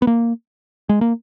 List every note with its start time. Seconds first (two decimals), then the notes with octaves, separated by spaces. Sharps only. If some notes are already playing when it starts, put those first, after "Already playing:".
0.02 B3
0.07 A#3
0.89 G#3
1.01 A#3